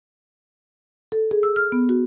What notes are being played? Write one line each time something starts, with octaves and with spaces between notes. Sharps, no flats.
A4
G#4
E6
F6
B3
F#4